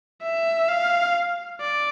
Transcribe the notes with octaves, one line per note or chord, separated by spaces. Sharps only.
E5
F5
D5